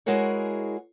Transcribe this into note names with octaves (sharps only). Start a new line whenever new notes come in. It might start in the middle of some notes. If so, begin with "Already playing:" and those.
G#3 E4 F#4 G#4 A#4 C#5